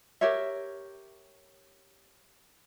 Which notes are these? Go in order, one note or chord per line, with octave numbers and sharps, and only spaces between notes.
G4 A#4 C#5 E5